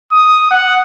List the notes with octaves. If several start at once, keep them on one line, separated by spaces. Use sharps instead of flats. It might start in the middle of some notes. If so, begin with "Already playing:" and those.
D#6
F#5